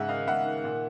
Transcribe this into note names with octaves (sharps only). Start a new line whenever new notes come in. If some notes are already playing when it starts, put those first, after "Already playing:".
Already playing: G#2 C#3 E5 F#5
D#3 D#5 F5
G#2 E5 F#5
D#3
A#2